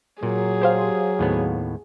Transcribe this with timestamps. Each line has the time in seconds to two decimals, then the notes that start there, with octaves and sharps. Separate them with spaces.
0.23 A#2 F#3 G#4
0.61 G4 C5 F5
1.19 D#2 A2 B3